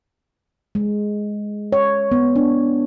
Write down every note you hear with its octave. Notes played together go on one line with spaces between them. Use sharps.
G#3
C#5
B3
D4